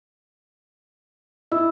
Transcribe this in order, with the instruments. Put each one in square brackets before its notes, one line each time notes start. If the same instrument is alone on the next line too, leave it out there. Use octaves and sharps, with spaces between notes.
[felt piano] E4 [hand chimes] D#5 E6